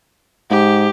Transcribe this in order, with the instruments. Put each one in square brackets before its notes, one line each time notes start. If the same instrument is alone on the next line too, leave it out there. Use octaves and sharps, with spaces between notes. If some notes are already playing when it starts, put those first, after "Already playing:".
[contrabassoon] G#2 [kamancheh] G4